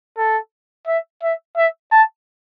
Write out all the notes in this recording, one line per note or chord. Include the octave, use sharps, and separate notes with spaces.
A4
E5
E5
E5
A5